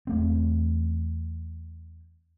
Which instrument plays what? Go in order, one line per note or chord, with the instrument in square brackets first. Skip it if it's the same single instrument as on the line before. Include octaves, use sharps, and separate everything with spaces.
[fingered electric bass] E2 A3 C4